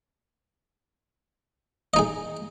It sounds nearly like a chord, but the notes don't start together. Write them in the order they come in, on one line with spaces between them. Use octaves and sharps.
D#5 D#4 G#4